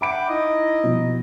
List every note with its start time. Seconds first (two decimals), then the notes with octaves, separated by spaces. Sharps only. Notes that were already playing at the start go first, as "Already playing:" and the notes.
0.01 E5 F#5 G5 B5 D6 D7
0.28 D#4 E4 D#5
0.84 B2 F3